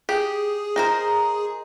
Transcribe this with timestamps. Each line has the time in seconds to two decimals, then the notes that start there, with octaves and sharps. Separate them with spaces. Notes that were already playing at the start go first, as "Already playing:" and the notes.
0.09 G4 G#4
0.76 D#4 A#4 C5